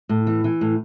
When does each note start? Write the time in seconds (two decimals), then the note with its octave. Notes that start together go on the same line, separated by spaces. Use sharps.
0.09 A2
0.27 E3
0.44 E3
0.61 A2